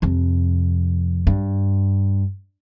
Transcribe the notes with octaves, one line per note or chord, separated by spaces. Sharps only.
F2 C3
G2